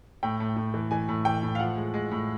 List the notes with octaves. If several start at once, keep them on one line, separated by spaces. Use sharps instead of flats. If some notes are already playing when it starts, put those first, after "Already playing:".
A2 G5
A2
A2
E3
E3 G#5
A2
E3 G5
A2
F5
F3 F#5
G#3
G#3
A2